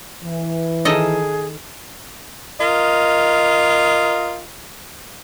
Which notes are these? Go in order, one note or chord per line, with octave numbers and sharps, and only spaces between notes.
E3
D#3 G#4 A4 D#5
F4 A#4 D#5